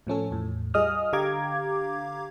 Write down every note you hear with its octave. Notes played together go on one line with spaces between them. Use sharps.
A2 F3 C#4 A4
E2 A2
G3 F4 G#4 D#5 D#6 F6
D3 G4 F5 A#5 D6 G#6